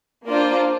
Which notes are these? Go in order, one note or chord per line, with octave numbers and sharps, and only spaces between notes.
A#3 D4 F4 C5